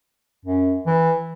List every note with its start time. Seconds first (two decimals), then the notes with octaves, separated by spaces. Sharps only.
0.45 F#2
0.86 E3